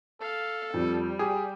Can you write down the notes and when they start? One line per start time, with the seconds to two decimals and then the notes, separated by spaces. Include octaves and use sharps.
0.21 A4 F5
0.74 F2 G3
1.19 G4 G#4